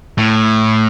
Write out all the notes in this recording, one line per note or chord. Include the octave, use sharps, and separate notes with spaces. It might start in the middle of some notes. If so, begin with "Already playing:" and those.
A2